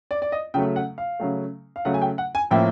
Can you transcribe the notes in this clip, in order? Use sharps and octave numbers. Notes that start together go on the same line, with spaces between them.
D5
D5
D#5
C#3 F#3 A3 G5
F#5
F5
C#3 F#3 A3
F5
C#3 F#3 A3 F#5
G#5
G5
F#5
G#5
A2 F3 A#3 C#4 E4 G5